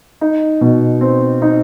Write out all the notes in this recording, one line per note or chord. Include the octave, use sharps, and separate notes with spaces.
D#4
B2
C4
D#4